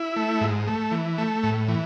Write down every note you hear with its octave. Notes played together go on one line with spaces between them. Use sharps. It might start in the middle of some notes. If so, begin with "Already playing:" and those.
Already playing: E4
A3
G#2
A3
E3
A3
A2
E3